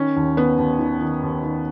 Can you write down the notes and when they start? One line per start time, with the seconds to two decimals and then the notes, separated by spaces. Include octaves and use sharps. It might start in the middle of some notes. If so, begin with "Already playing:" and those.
Already playing: D#3 C#4
0.16 D#2
0.37 D#3 B3
0.58 D#2
0.79 D#3
1.01 D#3
1.22 D#2
1.43 D#3